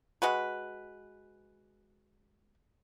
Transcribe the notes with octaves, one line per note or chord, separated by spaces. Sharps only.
G#3 F#4 B4